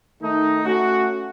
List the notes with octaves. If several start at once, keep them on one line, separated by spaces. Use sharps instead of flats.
D#3 A3 D#4
A3 C#4 F#4